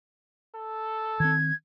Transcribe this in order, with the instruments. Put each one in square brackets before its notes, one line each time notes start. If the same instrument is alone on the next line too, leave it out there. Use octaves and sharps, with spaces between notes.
[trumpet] A4
[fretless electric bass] D#3 C4 [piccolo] G#6